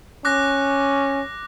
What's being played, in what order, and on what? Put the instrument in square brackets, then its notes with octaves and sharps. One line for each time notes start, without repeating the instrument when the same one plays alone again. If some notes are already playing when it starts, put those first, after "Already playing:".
[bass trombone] C#4 [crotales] D6 F#6 A#6